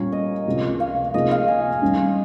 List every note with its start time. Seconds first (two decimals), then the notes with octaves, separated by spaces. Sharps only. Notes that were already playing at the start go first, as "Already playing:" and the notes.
Already playing: A#2 G3 C#4 A#4 C#5
0.12 D#5
0.47 C#2 C3 F3
0.80 F5
1.14 C3 F3 A#3 D#4 G#4 D#5
1.31 F5
1.48 G#5
1.82 D#3 G3 C#4